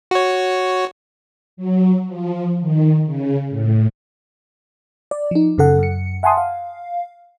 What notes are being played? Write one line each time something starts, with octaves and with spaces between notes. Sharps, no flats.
F#4 C#5
F#3
F3
D#3
C#3
A2
D5
F3 D#4
F#2 C#3 A4 F#5
F#2 C#7
E5 F#5 G#5 A5 C6 D#6
F5